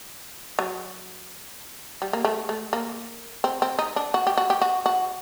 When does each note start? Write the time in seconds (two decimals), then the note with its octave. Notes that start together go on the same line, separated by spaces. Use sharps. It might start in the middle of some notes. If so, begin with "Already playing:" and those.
0.59 F#3
2.02 G3
2.13 A#3
2.25 A3
2.49 A3
2.73 A#3
3.44 C4
3.62 C4
3.79 D#4
3.96 D4
4.14 F#4
4.27 G4
4.37 F#4
4.50 G4
4.61 F#4
4.86 F#4